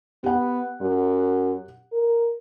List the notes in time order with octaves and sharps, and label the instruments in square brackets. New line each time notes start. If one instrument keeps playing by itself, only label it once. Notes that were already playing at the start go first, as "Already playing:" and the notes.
[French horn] B3 [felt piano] G4 F#5
[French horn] F#2
A#4